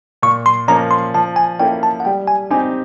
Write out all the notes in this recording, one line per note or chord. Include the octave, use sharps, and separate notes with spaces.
A#2 C#6
C6
F3 A#3 C#4 A#5
C6
F3 A5
G#5
A#3 C#4 E4 A4 G5
A5
F#5
G3 G5
G#5
C4 D#4 G4 G#5